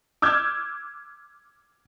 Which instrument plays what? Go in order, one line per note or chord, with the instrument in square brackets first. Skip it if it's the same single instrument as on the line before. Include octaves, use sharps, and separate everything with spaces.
[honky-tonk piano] D6 E6 F6 G6 G#6